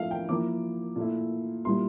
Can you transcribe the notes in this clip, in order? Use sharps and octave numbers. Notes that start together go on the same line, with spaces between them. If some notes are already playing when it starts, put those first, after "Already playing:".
Already playing: A2 F3 A3 E5 F5
G5
F3 A#3 E4 D6
A#2 A3 E4
A#2 G3 A#3 E4 C6